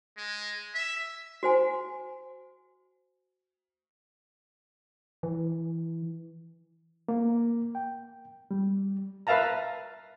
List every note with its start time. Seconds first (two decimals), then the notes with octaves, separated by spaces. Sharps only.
0.17 G#3
0.74 E5
1.43 F#4 C5 G#5
5.23 E3
7.08 A#3
7.75 G5
8.51 G3
9.27 A#4 B4 E5 F5 A5 A#5